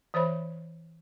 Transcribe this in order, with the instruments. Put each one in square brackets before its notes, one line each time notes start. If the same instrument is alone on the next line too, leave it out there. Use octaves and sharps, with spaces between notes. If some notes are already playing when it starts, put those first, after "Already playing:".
[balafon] E3 C5 C#5 E5 B5